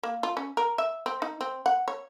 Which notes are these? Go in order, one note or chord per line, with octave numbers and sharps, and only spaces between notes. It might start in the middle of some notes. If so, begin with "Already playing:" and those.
A#3
F4
C#4
A#4
E5
C4
D#4
C4
F#5
C#5